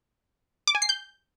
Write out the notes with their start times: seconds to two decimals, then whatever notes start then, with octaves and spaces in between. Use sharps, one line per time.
0.68 D6
0.75 G#5
0.82 C7
0.89 G6